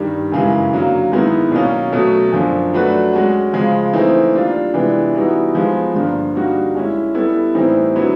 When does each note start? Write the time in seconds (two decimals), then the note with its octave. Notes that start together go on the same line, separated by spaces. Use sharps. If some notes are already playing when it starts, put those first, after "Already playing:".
Already playing: G2 D#3 G3
0.32 F#2 C#3 E3 G#3
0.72 D3 F#3 A#3
1.12 G#2 D#3 G#3 B3 E4
1.52 B2 F#3 A#3 C#4
1.92 B2 F#3 A3
2.32 F#2 D3 F3
2.73 F#3 A3 D4 F#4 B4
3.13 G#3 C#4 F#4
3.53 C#3 F3 G#3
3.93 E3 A3 C4 D#4
4.34 G3 A#3 D4 F4
4.74 C3 E3 G#3 B3 D4
5.15 E3 G3 B3 D#4 F#4
5.55 F3 G#3 B3 D#4 G#4
5.94 G2 D3 F3 A#3
6.35 D3 G3 A#3 D#4 F#4
6.75 G#3 C#4 E4
7.15 G3 B3 E4 A4
7.55 A2 E3 G3 C4 D#4
7.96 D3 F#3 B3 E4